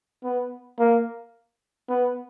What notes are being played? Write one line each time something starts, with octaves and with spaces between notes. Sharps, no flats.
B3
A#3
B3